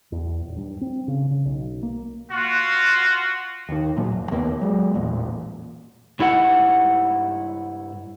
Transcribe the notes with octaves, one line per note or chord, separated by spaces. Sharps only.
E2
D#1
G2
C4
C#3
C#3
B1
A#3
F4 F#4
D#2 D#3
A#2 F#3 A#3
F1
D#2 A#3 B3
F#3 G#3
A1 E2 A#2
G2 E4 A4 F#5